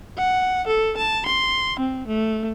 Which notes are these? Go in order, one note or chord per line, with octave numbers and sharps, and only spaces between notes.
F#5
A4
A5
C6
C4
A3